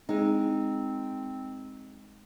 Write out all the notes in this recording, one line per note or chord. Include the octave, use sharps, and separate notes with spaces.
G#3 C4 D#4